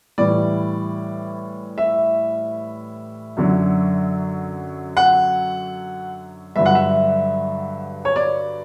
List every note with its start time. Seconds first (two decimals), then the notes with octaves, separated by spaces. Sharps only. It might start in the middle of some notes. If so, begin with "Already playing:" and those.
0.18 A2 E3 G3 D5
1.78 E5
3.37 F#2 D3 F#3
4.97 F#5
6.56 G2 D3 F#3 E5
6.66 F#5
6.75 E5
8.05 C#5
8.16 D5